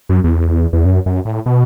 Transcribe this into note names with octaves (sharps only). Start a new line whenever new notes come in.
F#2
E2
E2
F#2
F#2
A2
B2